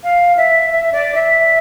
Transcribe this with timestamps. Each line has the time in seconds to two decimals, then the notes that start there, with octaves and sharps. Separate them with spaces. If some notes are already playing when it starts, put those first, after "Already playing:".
0.04 F5
0.37 E5
0.70 E5
0.92 D5
1.15 E5